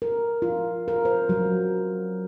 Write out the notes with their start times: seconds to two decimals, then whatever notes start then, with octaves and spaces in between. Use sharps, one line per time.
0.02 A#4
0.42 F4
0.88 A#4
1.05 C5
1.29 F#3